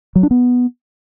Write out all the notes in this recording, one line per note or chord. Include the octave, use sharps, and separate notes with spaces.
F#3
D4
B3